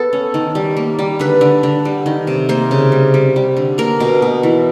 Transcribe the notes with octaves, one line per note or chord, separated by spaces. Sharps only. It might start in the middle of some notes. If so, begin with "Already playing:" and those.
Already playing: B3 A4
C#4
D#3
G3
A#3
G3
D3 B4
D3
D3
G3
D#3
C3
A#3 C5
C#3
G3
G3
G3
D3
A#3 A#4
B2
B2
E3